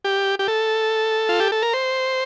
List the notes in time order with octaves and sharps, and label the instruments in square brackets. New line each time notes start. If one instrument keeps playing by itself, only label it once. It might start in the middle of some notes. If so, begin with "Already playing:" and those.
[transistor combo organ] G4
G4
A4
F4
G4
A4
A#4
C5